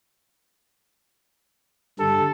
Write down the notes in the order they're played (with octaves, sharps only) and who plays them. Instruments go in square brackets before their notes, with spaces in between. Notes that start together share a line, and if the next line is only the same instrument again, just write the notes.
[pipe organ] G2 D3 G3 [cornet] A4